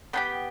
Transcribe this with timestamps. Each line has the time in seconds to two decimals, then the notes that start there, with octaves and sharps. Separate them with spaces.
0.13 B3 D4 G4 G5